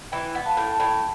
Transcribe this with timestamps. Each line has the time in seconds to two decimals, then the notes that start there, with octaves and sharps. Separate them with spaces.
0.12 E3 G5 B5
0.35 B3
0.46 F5 A5
0.57 A2
0.72 A5
0.79 A2 G5 B5